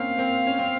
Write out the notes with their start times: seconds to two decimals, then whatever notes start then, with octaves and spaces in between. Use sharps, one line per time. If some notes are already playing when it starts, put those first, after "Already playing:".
Already playing: A#3 C4 C#4 F5
0.18 A#3 C4
0.47 C#4
0.59 C4